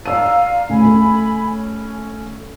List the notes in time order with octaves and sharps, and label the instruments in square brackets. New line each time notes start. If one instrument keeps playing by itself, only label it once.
[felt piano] D5 E6 D#7 [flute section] F5 A#5
[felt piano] D2 C#3 [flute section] G#5 B5
[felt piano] A3
[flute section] C#4